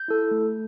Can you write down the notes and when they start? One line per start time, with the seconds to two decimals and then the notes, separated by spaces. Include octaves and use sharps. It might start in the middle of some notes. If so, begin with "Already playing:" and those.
Already playing: G6
0.08 E4 A4
0.31 A3